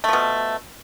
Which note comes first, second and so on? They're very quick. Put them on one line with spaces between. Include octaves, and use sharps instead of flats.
A3 F3 B2